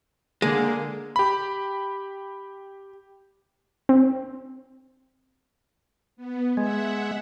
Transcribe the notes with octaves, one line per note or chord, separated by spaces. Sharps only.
D3 G#3 A#3
G4 B5
C4
B3
G#3 E5 F#5